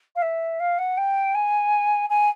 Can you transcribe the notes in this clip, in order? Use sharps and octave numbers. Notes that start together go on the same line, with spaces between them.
F5
E5
F5
F#5
G5
G#5
G#5